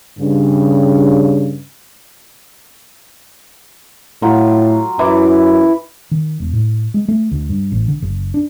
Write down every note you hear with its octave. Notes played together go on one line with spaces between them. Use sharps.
G2 C#3
A2 F#3 F4
F#2 E3 E4 D6
D#3
E1
A2
G#3
A3
D2
G2
A1
D3
F#1
D4